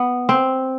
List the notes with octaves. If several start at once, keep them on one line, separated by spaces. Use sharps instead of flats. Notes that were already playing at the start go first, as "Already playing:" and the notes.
Already playing: B3
C4